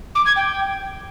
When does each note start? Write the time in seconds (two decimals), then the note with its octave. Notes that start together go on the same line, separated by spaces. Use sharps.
0.15 D6
0.26 G#6
0.36 G5